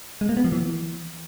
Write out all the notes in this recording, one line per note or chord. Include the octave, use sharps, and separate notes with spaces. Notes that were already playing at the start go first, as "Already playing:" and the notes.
G#3
A#3
B3
F3
E3